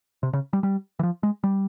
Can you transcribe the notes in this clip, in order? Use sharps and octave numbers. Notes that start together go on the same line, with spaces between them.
C3
C#3
G3
G3
E3
F3
G#3
G3